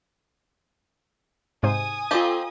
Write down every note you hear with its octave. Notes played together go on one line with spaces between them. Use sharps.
G#2 C3 C5 G#5 D#6
C4 F4 G4 A4 F5 A5